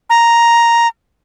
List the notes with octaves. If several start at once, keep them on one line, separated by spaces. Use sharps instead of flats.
A#5